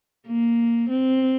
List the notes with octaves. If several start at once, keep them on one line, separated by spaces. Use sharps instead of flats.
A#3
C4